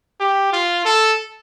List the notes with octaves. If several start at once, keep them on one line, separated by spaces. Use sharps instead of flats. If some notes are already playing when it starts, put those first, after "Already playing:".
G4
F4
A4